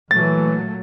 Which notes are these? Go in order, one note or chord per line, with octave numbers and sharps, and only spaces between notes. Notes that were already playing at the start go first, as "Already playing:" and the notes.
A#2 E3 F#3 A3 A6